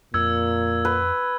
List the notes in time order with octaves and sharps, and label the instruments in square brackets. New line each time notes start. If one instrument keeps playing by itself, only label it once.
[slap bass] F2 [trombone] A#2 [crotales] E6 G#6
[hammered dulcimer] B4